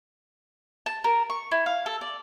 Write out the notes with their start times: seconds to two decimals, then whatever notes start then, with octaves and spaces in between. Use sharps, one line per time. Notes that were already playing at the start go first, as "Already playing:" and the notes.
0.86 A5
1.04 A#4
1.30 C#6
1.51 E4
1.66 F5
1.86 A4
2.01 D5